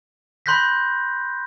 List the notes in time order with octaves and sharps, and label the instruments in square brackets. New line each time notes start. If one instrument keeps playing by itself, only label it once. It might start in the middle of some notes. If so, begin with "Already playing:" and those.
[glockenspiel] B5 C6 F#6 G6 A#6 B6